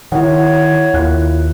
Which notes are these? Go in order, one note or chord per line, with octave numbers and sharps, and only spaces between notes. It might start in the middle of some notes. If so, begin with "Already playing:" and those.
D#3 E4 C#5 F#5
D#2 E4 F4 F#6